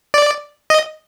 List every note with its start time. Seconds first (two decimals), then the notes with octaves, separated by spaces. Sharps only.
0.14 D5
0.70 D#5